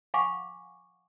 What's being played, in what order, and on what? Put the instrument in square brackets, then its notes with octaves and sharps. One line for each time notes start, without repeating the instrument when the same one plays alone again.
[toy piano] F5 F#5 G#5 B5 C#6 D6